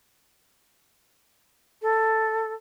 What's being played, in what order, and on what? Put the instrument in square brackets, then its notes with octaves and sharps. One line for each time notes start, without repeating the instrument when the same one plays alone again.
[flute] A4